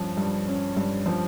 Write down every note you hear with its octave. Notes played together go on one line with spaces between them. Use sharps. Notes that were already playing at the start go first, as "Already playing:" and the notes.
Already playing: G2 F3 C#4
G2
C#4
G2
F3